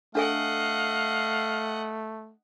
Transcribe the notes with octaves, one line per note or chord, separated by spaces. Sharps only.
A3 D4 A4 D#5 F5 F#5 G#5